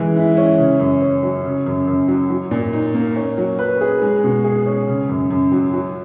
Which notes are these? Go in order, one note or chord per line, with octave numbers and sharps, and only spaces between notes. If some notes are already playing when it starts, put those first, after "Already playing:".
Already playing: E3 G#3
E4
C#4
C#3
F#2
C#4
F#3
C#3
F#2
F#2
F#3
F#3
A#2
D#4
A#3
C#4
F#3
B4
G#4
G#3
B2
G#4
C#4
C#3
F#2
F#2
F#3
F#3